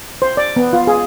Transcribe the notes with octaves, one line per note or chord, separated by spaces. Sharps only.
C5
D5
B3
F4
G#4